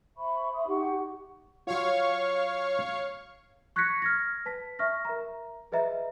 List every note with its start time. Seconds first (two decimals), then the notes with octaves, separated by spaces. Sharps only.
0.17 C5 E5 B5 C#6
0.55 E5 B5 C6 D#6
0.68 D#4 G4 F#5 C#6
1.67 F#3 F4 C#5 F5 C#6
3.76 C#6 F#6 G#6 A#6 B6 C#7
4.02 F6 G#6 A#6
4.46 B4 A5 B6
4.79 E5 C#6 F6 A#6
5.05 A#4 E5 A#5
5.72 G#4 B4 D#5 E5 A#5